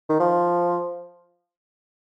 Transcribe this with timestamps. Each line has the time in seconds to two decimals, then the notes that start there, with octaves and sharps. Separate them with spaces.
0.10 D#3
0.20 F3